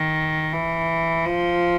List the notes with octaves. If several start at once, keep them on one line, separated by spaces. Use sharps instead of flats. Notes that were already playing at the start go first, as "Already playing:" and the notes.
Already playing: D#3
E3
F3